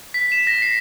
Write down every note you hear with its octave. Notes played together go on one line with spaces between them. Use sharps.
B6
E7
A#6
C7